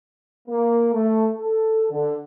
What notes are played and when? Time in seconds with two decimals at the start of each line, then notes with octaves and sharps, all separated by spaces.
0.49 A#3
0.92 A3
1.32 A4
1.91 D3